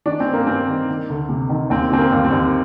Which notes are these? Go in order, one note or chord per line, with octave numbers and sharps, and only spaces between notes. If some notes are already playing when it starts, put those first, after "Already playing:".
D#3 D4
C4
G2
A#3
G2 C4
D#3
D#3
D2
C3
D#3
D#2 C4
D3 C4
A#3
D#2
C4
D#2